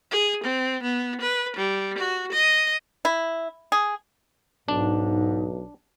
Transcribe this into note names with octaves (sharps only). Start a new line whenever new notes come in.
G#4
C4
B3
B4
G3
F#4
D#5
E4
G#4
B1 G#2 D4